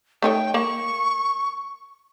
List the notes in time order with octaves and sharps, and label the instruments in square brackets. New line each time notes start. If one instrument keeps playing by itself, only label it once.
[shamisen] A3 D#4 C#5 [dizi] G5
[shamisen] A#3 [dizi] C#6